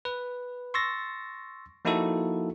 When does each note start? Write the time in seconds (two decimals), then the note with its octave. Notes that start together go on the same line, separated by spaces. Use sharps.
0.05 B4
0.74 C6 C#6 E6 A6 A#6
1.85 F3 A#3 D#4 E4 F#4 A4